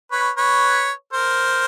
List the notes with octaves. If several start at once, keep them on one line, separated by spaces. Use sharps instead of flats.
B4 C#5
B4 C#5
A#4 C5